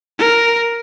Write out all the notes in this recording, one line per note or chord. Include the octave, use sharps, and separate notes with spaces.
A#4